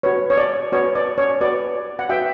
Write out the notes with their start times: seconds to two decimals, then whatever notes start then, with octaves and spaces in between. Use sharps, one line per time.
0.03 F#4 B4 C#5
0.30 C#5
0.37 D5
0.72 F#4 B4 C#5
0.95 D5
1.18 C#5
1.41 F#4 B4 D5
1.99 F#5
2.09 F#4 B4 E5 G5